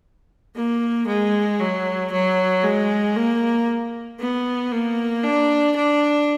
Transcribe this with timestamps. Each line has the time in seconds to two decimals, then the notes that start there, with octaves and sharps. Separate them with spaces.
0.55 A#3
1.07 G#3
1.60 F#3
2.12 F#3
2.64 G#3
3.16 A#3
4.20 B3
4.72 A#3
5.23 D4
5.76 D4